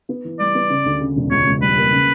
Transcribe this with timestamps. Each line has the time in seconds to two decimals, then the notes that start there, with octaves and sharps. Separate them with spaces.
0.09 B3
0.24 E3
0.39 G3 D5
0.55 B3
0.70 C#3
0.85 D2
1.01 C#3
1.16 E1
1.31 C#2 C#5
1.46 C#2
1.61 G3 B4
1.77 A#3
1.92 C#3